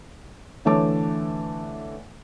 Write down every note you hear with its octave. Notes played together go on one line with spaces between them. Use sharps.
D3 E3 A3 C#5 A5 D6